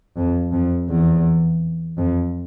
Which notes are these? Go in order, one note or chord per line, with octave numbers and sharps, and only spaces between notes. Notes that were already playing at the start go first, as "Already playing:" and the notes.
F2
F2
E2
F2